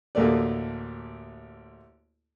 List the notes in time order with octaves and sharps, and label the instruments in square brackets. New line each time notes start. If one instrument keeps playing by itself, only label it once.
[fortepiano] A1 D2 A3 A#3 D5